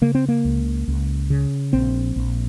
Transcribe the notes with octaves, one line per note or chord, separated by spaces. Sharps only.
C#3 A#3
C4
A#3
C#2
C#2
C#3
A#1 C4
A#1